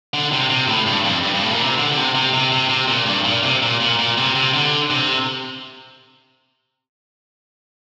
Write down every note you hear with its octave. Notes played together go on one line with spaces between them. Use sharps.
D3
C3
C3
A2
G2
F2
G2
G2
A2
A#2
C3
D3
D3
C3
C3
C3
C3
C3
A#2
G2
A#2
C3
A#2
A#2
A#2
C3
C3
D3
C3